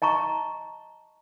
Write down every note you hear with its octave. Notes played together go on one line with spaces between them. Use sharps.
D#5 A5 A#5 C#6